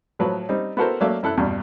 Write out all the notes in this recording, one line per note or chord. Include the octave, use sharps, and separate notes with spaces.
A2 F3 F#3 B4
G3 C4 D#4
B3 E4 F#4 A4 A#4 C5
F#3 A3 A#3 D5 E5
F#2 E4 A4 E6 F#6
E2 G2 B2